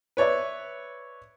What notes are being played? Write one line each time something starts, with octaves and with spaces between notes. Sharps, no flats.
B4 C#5 D5 E5